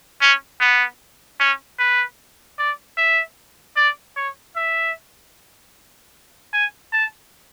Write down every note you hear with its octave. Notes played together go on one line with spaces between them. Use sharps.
C#4
B3
C#4
B4
D5
E5
D5
C#5
E5
G#5
A5